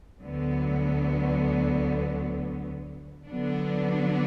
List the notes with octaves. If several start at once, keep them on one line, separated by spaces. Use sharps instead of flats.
D2 D3 F#3 B3
D3 F#3 B3 D4